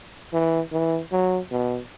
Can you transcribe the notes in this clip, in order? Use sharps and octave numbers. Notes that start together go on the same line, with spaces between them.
E3
E3
F#3
B2